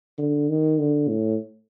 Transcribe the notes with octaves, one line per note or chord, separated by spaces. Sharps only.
D3
D#3
D3
A2